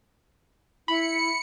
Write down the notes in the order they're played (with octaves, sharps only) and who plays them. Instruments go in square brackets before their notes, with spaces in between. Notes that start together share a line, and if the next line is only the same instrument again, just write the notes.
[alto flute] E4 [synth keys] B5 [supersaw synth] C#7